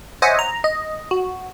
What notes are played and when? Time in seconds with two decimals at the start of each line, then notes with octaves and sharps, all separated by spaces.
0.22 C5 C#5 D#5 E5 F#5 G#5
0.39 A#5
0.64 D#5
1.11 F#4